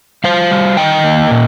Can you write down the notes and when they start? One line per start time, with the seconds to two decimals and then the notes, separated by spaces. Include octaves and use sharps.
0.24 G3 C5 F5
0.51 G3
0.77 D#3 D#5 G5
1.04 A#3
1.31 A#2